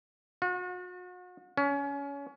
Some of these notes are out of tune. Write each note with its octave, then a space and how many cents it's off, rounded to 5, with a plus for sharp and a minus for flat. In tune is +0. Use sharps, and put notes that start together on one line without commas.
F#4 -40
C#4 +25